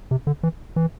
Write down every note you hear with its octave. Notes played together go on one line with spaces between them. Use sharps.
C3
D3
E3
E3